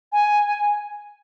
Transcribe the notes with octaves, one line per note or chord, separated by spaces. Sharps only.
G#5